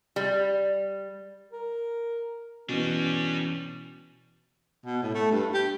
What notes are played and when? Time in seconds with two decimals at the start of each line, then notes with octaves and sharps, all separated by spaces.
0.16 G3
1.52 A#4
2.69 B2 E3 G3 C#4 D4
4.86 B2
5.03 A2
5.14 A3
5.31 G2
5.54 G4